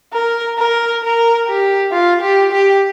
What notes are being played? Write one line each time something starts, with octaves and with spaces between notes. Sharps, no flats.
A#4
A#4
A#4
G4
F4
G4
G4